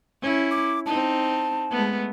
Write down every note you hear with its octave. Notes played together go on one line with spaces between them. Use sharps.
C#4 E4
D6
C4 D#4 A5
G#3 A3 B3